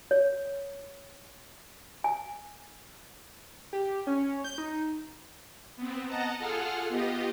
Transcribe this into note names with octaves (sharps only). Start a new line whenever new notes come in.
C#5
G#5
G4
C#4
G6
D#4
B3 C4
D#5 F#5 A5 A#5
F4 G#4 A4 F#5 F6
B3 F4 G4 D#5